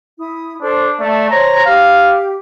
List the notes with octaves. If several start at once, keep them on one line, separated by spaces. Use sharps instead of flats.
E4 D#6
D4 A4 C5
A3 D5 E5 A5
C5 C#5 A#5
G4 F5